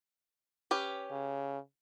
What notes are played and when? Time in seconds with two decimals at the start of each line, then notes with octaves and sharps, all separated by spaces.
0.71 C#4 G4 B4
1.11 C#3